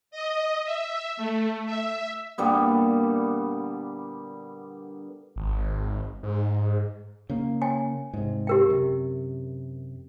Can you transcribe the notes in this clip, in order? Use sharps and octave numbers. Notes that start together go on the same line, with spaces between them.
D#5
E5
A3
E5
A#2 D3 G3 B3
G#1
G#2
C#3 A#3
C#5 G5 G#5
G#2 C3
G4 A#4 G5
F#2 C3